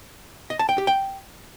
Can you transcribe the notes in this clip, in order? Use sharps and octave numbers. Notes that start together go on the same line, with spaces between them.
D#5
A5
G5
G4
G5